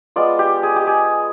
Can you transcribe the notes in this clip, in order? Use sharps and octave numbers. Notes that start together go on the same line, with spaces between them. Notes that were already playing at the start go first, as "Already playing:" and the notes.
G#3 B3 F4 D5
G4
G#4
G4
G#4